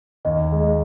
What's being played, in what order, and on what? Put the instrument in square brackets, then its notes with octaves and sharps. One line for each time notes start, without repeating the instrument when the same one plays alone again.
[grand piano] D#2 [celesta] D#5
[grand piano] G#3